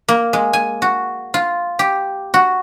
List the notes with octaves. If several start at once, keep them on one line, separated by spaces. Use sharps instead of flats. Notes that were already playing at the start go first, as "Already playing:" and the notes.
A#3
G#3
G#5
F#4
F4
G4
F#4